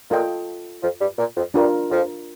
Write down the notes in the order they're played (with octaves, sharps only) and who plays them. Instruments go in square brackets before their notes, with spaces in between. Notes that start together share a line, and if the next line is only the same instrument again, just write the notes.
[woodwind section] A#2 [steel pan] F4 A4 D#5 G5
[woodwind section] F2 F3
G2 G3
A#2
F2 F3
[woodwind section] G2 G3 [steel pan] D4 F4 A#4
[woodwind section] F2 F3